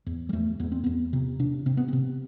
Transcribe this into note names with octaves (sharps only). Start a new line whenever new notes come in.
E2
G3
E2 A3
E2 B3
C4
E2 B3
C3
C3 D4
C3 C4
B3
C3 C4